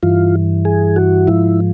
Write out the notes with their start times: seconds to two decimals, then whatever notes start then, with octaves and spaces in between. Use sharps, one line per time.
0.03 G2 E3 F4
0.65 G#4
0.96 F#4
1.27 G#2 F3 E4